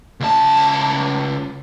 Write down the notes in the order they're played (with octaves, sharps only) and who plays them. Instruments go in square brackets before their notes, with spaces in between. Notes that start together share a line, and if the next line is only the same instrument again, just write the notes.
[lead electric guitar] C#2 A5